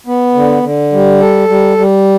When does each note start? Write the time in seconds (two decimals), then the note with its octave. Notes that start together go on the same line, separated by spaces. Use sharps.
0.07 B3
0.34 D3
0.63 D3
0.92 G3
1.20 A4
1.48 G3
1.77 G3